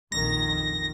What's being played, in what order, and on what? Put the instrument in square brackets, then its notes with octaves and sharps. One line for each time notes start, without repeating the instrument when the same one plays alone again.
[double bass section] A#1 F2 D#3 [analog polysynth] A#6